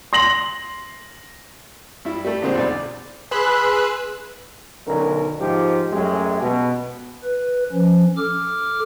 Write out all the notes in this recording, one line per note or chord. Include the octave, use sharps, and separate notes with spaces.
C6 A#6 F#7
G2 E4
G3 A3
A#2 D3 G#3 C4 D4
B1 E2 C5 D5
G#4 B4 B5 C6 E6 F#6
B1 D3 D#3 C#4 A#4
G#2 F3 D#4 G4
F#2 F#3 G#3 A3 C#4 G4
B2
B4
F3 C#4
A4 D6 F6